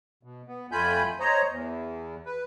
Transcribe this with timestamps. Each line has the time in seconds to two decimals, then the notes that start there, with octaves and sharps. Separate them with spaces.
0.23 B2
0.47 B3
0.72 F2 A3 F4 G#5 B5 G6
1.20 C5 C#5 D#5 A#5
1.50 E2
2.26 B4